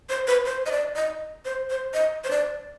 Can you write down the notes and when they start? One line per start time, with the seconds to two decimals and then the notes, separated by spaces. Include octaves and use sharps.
0.09 C5
0.27 B4
0.46 C5
0.66 D#5
0.71 D5
0.96 D#5
1.45 C5
1.70 C5
1.94 D#5
2.24 C5
2.31 D5